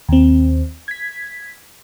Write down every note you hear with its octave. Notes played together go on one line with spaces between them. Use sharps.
D#2 C4
G#6 B6